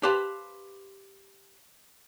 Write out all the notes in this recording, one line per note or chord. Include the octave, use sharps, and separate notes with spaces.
G4 B4 C5 F5 A5